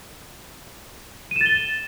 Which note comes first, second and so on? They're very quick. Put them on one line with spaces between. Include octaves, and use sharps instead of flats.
D#7 E7 A6 G7